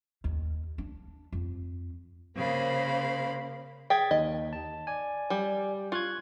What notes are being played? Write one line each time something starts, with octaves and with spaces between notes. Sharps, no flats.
D#2
D4
F2
C#3 A#3 C5 F5 B5
G#4 G5 G#6 A6 B6
D#2 D#5
A5
D5 G#5
G3
F4 C#6 F#6 G#6